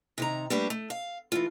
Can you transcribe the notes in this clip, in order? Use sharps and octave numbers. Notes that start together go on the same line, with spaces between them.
C3 D#3 A#5
G3 A3 A#3 D4 G4 B4
A3
F5
E3 A3 F4